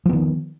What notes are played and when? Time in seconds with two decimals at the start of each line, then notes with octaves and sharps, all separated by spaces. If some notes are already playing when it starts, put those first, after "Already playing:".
0.05 F3
0.09 B3
0.13 D#3